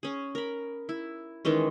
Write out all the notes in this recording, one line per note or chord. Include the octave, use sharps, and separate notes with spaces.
C#4 G#4
A#4 B5
E4
D#3 E3 G#3 C#4